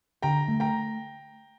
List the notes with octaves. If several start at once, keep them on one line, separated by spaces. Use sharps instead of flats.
D3 G5 A#5
A3
G5 A#5